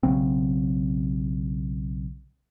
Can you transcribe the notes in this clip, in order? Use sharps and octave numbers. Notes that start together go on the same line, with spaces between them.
B1 C#3 F#3 C4